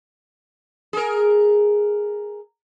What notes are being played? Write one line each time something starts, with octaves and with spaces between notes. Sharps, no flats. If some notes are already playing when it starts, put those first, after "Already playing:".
G#4 A#4